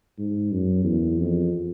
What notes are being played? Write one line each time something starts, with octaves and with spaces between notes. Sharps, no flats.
G#2
F#2
E2
F2